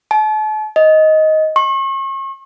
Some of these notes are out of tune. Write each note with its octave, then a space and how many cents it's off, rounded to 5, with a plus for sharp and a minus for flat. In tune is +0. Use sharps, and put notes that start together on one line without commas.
A5 -40
D#5 +10
C#6 -40